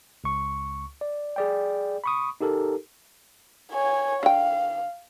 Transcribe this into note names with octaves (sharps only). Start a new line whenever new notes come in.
C#2 C#6
D5
G#4 D5 G5
B5 C#6 D#6
D#4 G4 A4 A#4
C#5 G#5
D3 F5 G5